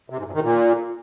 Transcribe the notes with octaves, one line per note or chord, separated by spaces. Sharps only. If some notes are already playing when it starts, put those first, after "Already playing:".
C3
G#2
G2
D#3
A#2